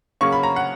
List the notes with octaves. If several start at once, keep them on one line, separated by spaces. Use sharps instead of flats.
C#3 F#3 A#3 C#4 C#6
B5
A#5
F#5